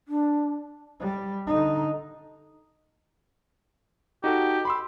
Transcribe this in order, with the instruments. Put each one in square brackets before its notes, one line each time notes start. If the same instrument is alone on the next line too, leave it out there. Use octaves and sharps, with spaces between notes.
[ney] D4
[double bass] G3
D3 D#4
[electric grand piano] D#4 F#4 A4 [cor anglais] G4
[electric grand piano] B5 C6 E6